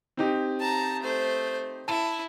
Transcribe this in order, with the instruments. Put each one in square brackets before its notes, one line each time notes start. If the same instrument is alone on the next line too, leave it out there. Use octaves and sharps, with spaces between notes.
[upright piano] C4 D#4 G4
[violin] A5 A#5
A3 C5
[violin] E4 [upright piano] A5